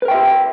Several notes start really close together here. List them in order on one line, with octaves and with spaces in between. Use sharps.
B4 A#4 G5 E5 G4